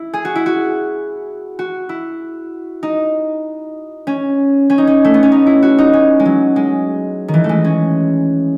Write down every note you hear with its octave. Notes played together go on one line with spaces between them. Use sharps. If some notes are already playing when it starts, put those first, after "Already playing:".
Already playing: E4
G#4
F#4
E4
F#4
F#4
E4
D#4
C#4
C#4
D#4
C#4
A3
B3
C#4
D#4
E4
F#4
D#4
C#4
G#3
F#3
G#3
D#3
E3
A3
G#3
C#4